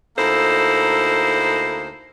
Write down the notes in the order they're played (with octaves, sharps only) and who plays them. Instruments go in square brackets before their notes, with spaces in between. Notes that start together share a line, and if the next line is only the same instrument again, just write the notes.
[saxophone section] D2 A#3 D#4 E4 A4 C5